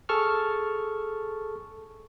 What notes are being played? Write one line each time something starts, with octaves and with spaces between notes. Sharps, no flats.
G#4 A4 A5 C#6 F6